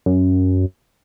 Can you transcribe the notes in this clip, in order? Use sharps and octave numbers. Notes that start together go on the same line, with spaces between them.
F#2